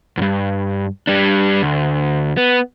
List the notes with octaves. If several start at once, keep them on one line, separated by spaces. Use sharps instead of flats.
E2 G2
G3 D4
D2
B3